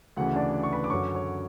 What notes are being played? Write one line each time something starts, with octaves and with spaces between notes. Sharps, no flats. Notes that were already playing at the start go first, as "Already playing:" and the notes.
D2 C#3 E3 F#4 F#5
D4 D5
C#6
B4 B5
D6
F#2 D3 F#3 C#5 C#6
C#5 C#6